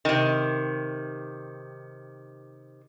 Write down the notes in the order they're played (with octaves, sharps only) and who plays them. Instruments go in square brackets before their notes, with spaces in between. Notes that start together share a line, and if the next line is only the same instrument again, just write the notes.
[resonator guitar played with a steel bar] C3 D#3